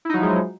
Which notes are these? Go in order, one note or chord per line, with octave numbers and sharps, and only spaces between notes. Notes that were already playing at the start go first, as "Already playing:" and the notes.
F3 F#3 G#3 D#4 E4